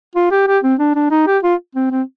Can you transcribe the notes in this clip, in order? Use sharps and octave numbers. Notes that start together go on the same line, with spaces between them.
F4
G4
G4
C4
D4
D4
D#4
G4
F4
C4
C4